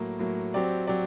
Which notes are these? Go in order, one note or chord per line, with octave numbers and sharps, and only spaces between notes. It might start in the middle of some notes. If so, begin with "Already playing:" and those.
Already playing: A2 F#3 A#3
A2 F#3 A#3
F#3 C4 G4 D5
F#3 C4 G4 D5